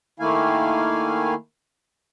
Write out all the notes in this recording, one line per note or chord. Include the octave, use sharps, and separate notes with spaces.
D#3 A3 A#3 E4 F5 G#5